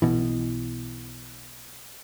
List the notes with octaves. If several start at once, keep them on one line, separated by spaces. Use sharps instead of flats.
B1 B2 E3